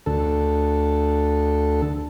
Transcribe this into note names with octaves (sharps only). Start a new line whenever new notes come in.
D2 A4